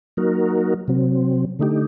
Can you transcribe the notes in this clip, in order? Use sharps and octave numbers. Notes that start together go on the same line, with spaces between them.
F#3 A#3 D#4 F#4 A#4
C3 F#3 C4
D3 A3 D#4 G4